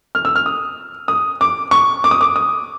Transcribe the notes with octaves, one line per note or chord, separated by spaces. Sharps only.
F6
E6
F6
D#6
D#6
D6
C#6
D6
D#6
D6
D#6